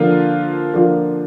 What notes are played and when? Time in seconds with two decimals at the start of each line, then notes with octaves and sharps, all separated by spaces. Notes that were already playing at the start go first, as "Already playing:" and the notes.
Already playing: D3 F3 A#3 F4
0.74 D3 F3 A#3 F4